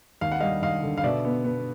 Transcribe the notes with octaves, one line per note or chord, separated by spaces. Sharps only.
D#2 F5
F#5
G3 D#5 F5
D#2 D#5 F5
D3
F5
B2 D5 E5
B3
B3